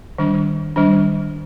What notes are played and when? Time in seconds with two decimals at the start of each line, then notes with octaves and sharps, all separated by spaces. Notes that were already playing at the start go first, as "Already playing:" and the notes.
0.18 D#3 G3 D4
0.76 D#3 G3 D4